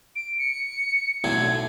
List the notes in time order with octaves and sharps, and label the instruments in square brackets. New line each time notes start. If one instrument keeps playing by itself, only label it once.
[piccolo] D7
C#7
[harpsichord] B1 A2 D3 [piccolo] G#6